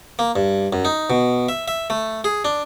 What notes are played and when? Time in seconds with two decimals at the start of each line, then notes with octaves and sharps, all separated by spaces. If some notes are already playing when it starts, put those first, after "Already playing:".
0.19 A#3
0.36 G2
0.73 F#2
0.85 D#4
1.10 B2
1.49 E5
1.68 E5
1.90 A3
2.24 G#4
2.45 D4